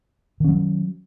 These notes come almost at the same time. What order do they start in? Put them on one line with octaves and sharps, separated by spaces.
D#3 C#4 F#3